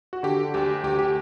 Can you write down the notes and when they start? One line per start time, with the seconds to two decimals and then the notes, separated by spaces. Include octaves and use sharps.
0.13 F#4
0.23 D3 G4
0.54 D2 G4
0.84 D2 G4
0.99 G4